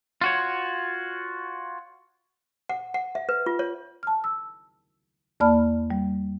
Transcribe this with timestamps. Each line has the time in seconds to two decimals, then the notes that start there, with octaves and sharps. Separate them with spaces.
0.21 F4 F#4 C#5
2.69 F#5
2.94 F#5
3.15 E5
3.29 B4
3.46 F4
3.59 C#5
4.03 A5 F6
4.24 E6
5.40 E2 A#3 D5 A5 B5 F6
5.90 G3